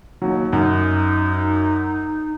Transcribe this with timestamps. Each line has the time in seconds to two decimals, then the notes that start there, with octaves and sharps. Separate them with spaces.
0.22 D#2 F#3
0.53 F#2 D#4